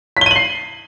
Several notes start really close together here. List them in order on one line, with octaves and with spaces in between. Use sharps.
B6 G7 D#7 F#7 C7